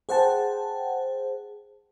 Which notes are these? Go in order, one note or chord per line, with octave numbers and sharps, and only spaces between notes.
G#4 C5 F#5 G5 A5